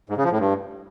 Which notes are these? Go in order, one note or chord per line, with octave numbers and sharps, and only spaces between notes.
G#2
C#3
F3
A2
G2